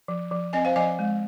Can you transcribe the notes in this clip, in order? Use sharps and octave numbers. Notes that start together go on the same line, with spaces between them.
F3
F3
C4 D#5 G#5
C5 F5
F3 D#5 G#5
G#3